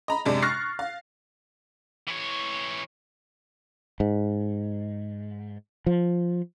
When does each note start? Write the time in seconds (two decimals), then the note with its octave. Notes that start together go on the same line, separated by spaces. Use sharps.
0.08 D#5 A#5 B5
0.25 F#2 C3 G#3 D4
0.42 C#6 F6 F#6 A6 A#6 C7
0.79 F5
2.07 E3 C#5
4.00 G#2
5.86 F3